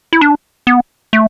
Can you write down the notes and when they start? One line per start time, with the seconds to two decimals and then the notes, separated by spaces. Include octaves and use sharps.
0.13 E4
0.21 D4
0.67 B3
1.13 A3